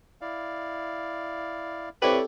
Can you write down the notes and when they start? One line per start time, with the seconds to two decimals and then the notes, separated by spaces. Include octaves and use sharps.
0.21 E4 D5 F5
2.02 C4 E4 G4 A4 B4 C#5 D5